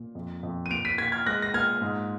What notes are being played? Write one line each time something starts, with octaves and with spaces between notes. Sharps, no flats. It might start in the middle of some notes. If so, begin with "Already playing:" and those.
Already playing: A#2
F2
F2
D#7
A#2 D7 F7
B6 D#7
A#2 G#6 B6
F6 G#6
G#3 F#6 A#6
A#6
A#2 F6 G#6
G#2